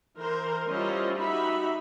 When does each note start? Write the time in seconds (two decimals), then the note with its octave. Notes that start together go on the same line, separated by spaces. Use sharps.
0.18 E3 A#4 C5
0.69 G3 C#4 E4 F4 C5 D#5
1.18 D#4 F#4 G4 E5 B5